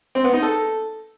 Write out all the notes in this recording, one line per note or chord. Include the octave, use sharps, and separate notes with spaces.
C4
B3
D#4
A4